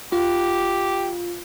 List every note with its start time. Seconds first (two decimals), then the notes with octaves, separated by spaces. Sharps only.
0.12 F4 G4